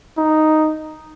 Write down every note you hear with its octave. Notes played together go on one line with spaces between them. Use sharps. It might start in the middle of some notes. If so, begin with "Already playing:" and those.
D#4